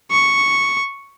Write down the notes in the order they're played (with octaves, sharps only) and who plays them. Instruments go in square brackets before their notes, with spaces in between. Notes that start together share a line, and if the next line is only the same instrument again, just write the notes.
[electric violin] C#6